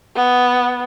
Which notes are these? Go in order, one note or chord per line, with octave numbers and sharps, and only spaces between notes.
B3